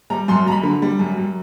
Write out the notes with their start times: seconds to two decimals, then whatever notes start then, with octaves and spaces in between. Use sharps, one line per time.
0.10 G3 A#5
0.28 F#2 C6
0.47 F#2 A#5
0.52 B5
0.63 D3
0.82 G3
0.99 F#2
1.17 F#2